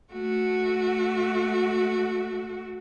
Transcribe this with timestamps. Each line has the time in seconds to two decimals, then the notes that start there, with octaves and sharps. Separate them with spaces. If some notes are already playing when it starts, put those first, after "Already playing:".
0.13 A3 F#4